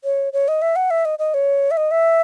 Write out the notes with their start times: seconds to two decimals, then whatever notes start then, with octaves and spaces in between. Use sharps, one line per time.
0.04 C#5
0.33 C#5
0.48 D#5
0.62 E5
0.76 F#5
0.91 E5
1.05 D#5
1.19 D#5
1.34 C#5
1.71 E5
1.77 D#5
1.91 E5